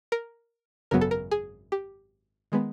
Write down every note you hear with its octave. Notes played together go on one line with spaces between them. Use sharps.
A#4
G#1 F#2 C#3 F#3 B3 A#4
A4
A#4
G#4
G4
D#3 G#3 B3